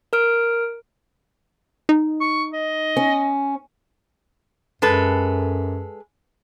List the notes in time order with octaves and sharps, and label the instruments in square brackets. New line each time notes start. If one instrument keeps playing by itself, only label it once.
[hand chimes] A#4 F6 D7
[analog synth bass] D#4
[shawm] C#6
D#5
[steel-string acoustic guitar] C#4
[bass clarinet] F#2 [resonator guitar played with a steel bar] G#3 A4 B4